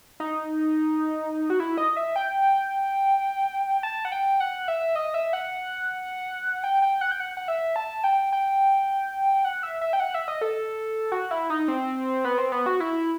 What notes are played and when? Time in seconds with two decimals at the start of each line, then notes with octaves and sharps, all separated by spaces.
0.20 D#4
1.50 F#4
1.60 E4
1.78 D#5
1.96 E5
2.16 G5
3.83 A5
4.05 F#5
4.12 G5
4.40 F#5
4.68 E5
4.95 D#5
5.14 E5
5.33 F#5
6.64 G5
6.82 G5
7.01 F#5
7.11 G5
7.20 F#5
7.37 F#5
7.48 E5
7.76 A5
8.04 G5
8.32 G5
9.44 F#5
9.63 E5
9.81 E5
9.93 G5
10.00 F#5
10.14 E5
10.28 D#5
10.41 A4
11.12 F#4
11.31 E4
11.50 D#4
11.68 C4
12.24 B3
12.38 C4
12.52 B3
12.66 F#4
12.80 E4